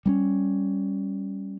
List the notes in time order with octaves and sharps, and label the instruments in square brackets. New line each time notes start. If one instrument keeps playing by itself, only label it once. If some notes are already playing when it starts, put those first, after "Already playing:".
[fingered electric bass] G3 A#3 C#4